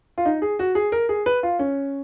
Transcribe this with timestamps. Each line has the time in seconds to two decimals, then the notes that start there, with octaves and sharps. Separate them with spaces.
0.18 F4
0.25 D#4
0.42 G#4
0.59 F#4
0.75 G#4
0.92 A#4
1.09 G#4
1.26 B4
1.43 F4
1.59 C#4